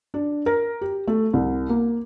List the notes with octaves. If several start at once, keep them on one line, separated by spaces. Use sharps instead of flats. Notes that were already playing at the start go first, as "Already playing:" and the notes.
D4
A#4
G4
A3
C2
A#3